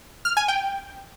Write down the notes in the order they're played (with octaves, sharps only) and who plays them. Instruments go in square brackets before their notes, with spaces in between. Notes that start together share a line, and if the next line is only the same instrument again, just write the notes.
[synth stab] F6
G#5
G5